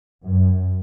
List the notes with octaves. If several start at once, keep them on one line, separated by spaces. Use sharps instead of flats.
F#2